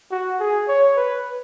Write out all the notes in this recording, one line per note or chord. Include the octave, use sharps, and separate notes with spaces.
F#4
G#4
C#5
B4